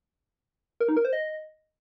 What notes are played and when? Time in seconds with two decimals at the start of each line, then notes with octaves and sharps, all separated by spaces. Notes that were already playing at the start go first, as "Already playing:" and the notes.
0.80 A#4
0.89 D#4
0.97 A#4
1.05 C5
1.13 D#5